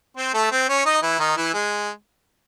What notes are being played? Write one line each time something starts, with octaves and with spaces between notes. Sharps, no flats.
C4 C5
A3 A4
C4 C5
C#4 C#5
D#4 D#5
E3 E4
D#3 D#4
E3 E4
G#3 G#4